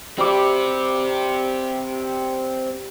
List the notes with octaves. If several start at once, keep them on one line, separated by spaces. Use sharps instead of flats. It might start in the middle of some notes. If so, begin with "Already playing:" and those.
G3 C4 G4 D6